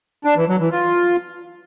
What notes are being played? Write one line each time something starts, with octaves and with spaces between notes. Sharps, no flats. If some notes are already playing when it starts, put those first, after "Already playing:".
D4
E3
F#3
E3
F4